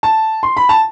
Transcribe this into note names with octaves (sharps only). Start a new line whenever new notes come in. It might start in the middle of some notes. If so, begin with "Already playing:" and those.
A5
C6
B5
A5